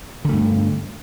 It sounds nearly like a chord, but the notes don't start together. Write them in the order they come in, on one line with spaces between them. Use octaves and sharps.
D3 A3 G2